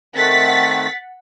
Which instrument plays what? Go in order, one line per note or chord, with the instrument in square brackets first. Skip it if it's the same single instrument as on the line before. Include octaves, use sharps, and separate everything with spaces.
[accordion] D#3 A3 C4 [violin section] F#5 A6 B6